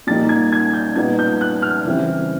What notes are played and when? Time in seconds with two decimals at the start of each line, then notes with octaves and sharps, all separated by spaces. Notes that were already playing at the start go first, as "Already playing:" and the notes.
0.07 A#2 G3 A#3 D#4 A6
0.29 G#6
0.52 G#6
0.74 G6
0.96 A#2 G3 B3 D#4 G#6
1.19 G6
1.41 F#6
1.62 F6
1.85 C#3 E3 G3 C4